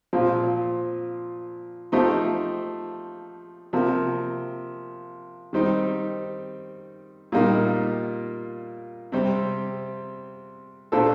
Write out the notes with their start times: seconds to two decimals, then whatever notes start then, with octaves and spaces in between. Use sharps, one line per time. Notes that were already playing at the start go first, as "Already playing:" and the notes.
0.13 A#2 F3 C4
1.92 F3 A3 D#4 G4 C5
3.73 C3 F3 A#3
5.53 D#3 G3 C4 D#4
7.32 A#2 G3 A#3 D#4
9.12 C3 G3 C4
10.92 A#2 A3 D4 A4 C5